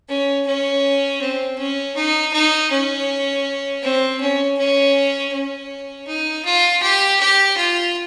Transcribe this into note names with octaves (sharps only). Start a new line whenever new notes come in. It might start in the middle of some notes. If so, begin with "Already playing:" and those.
C#4
C#4
C4
C#4
D#4
D#4
C#4
C4
C#4
C#4
C#4
D#4
F4
G4
G4
F4